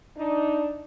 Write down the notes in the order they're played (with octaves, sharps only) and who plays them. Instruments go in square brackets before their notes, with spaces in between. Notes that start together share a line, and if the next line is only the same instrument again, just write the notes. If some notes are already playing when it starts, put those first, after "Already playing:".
[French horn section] D4 D#4